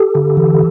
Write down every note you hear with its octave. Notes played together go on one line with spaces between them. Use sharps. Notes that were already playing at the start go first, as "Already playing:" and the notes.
Already playing: G4 A4
D3
E3